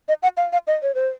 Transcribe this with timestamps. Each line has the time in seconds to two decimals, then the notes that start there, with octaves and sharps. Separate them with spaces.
0.08 D#5
0.23 F#5
0.37 F5
0.53 F5
0.67 D#5
0.82 C#5
0.95 C5